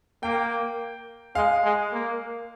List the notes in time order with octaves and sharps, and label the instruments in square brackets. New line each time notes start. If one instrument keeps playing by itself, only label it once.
[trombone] A#3 [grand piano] G5
[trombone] G#3 [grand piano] F5
[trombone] G#3
A#3